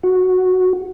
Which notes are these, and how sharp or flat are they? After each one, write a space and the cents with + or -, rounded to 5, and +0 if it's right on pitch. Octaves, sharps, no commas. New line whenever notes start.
F#4 -5